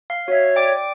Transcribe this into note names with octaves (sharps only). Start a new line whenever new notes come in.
F5
F#4 C#5 E5
D5 G5 D6